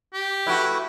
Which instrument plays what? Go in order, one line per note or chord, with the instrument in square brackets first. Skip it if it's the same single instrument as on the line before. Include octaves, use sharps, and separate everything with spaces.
[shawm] G4
[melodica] A3 B4 [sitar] E4 F#4